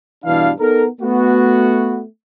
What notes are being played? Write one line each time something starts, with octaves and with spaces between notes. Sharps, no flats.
G2 B2 E3 D4 E4 F5
B3 D#4 A4 A#4
A3 B3 F#4